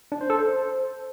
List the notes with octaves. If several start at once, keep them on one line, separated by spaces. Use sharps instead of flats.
D4
C5
A4
C5